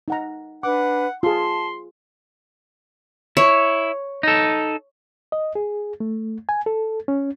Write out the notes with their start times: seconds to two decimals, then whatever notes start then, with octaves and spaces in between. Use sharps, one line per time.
0.08 D#4 F#5 A#5
0.63 D4 B4 F#5 D6
1.23 F4 G#4 A5 C6
3.37 E4 C#5
4.23 D#4 A4
5.32 D#5
5.55 G#4
6.00 A3
6.49 G#5
6.66 A4
7.08 C#4